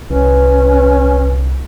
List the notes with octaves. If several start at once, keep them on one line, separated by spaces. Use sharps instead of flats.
C2 C#4 B4